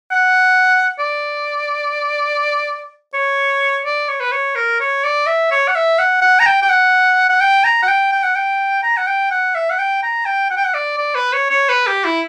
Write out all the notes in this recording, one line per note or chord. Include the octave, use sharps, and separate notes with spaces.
F#5
D5
C#5
D5
C#5
B4
C#5
A#4
C#5
D5
E5
C#5
F#5
E5
F#5
F#5
A#5
G5
G5
F#5
F#5
G5
A#5
F#5
G5
G5
F#5
G5
A#5
F#5
G5
F#5
E5
F#5
G5
A#5
G5
F#5
G5
F#5
D5
D5
B4
C#5
C#5
B4
G4
E4